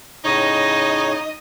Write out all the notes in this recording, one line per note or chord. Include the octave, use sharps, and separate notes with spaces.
A2 C#3 D#4 C#5 D#5